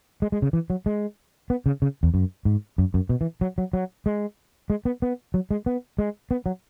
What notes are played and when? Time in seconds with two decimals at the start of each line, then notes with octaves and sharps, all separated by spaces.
0.22 G#3
0.32 G#3
0.42 C#3
0.53 E3
0.70 F#3
0.86 G#3
1.50 B3
1.66 C#3
1.82 C#3
2.03 E2
2.14 F#2
2.45 G#2
2.78 F#2
2.94 F#2
3.09 B2
3.21 E3
3.41 F#3
3.58 F#3
3.73 F#3
4.06 G#3
4.70 G#3
4.85 B3
5.02 B3
5.34 F#3
5.51 G#3
5.66 B3
5.99 G#3
6.31 B3
6.46 F#3